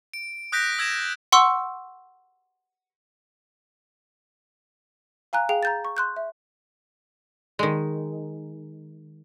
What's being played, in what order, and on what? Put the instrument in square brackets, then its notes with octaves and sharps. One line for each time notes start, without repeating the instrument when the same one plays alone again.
[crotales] D7
D#6 F#6 G6 A#6 B6 D7
E6 G#6 A#6 E7
[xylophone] F#5 C6 C#6 E6
F5 G#5 A#5 F#6
G#4 F5 G5 F7
A#5 G6 A6
C#6
C6 F#6 G6
E5
[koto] D#3 G#3